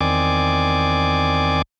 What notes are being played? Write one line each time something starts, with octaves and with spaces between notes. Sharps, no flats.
E2 D#3 C4 D5 G#5 D6